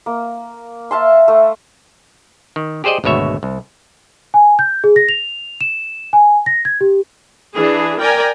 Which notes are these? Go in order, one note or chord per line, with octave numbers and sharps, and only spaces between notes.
A#3
E5 F5 A5 C6
A3
D#3
G4 G#4 C5 D5 D#5
G#1 D2 B2 C#5 E5
C2
G#5
G6
G#4
A#6
F7
E7
G#5
A#6
G#6
G4
E3 D4 G#4
A#4 D5 G5 G#5 A#5